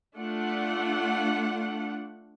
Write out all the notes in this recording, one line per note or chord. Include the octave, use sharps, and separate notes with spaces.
A3 D4 F4 F#5